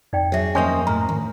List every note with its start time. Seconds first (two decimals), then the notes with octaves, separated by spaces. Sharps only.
0.13 F2 D#4 D5 G5
0.32 F#3 G#4 C#5 E5
0.55 D#2 F3 A#3 C#4 C5 D#5 G#5
0.87 A2 A#4
1.09 D2 D#3